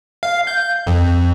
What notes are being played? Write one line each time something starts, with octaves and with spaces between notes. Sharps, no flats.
F5
G6
F2